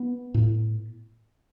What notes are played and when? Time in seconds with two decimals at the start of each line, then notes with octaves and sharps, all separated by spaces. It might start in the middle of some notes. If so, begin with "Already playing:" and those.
Already playing: B3
0.34 A2